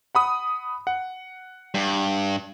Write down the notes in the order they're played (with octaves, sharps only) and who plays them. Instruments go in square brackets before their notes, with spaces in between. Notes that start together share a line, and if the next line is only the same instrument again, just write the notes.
[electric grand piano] F#5 B5 D#6
F#5
[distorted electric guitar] G2